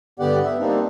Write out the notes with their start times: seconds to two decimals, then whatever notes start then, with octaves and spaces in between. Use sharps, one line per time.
0.20 G2 D3 B3 G4 D5 F#5
0.44 E5
0.59 G3 A#3 C4 D4 D#4